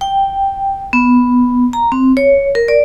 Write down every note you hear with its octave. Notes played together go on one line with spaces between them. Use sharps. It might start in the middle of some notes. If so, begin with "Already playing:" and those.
G5
B3
A#5
C4
C#5
A#4
D5